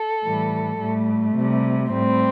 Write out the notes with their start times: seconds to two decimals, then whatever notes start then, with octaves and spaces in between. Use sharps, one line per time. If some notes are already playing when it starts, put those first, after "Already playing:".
Already playing: A4
0.24 A2 E3 G3
0.79 A2 G3 A3
1.36 C3 G3
1.91 A2 G3 C4